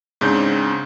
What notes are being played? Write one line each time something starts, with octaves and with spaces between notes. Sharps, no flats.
G#2 C#3 C4 D4 G6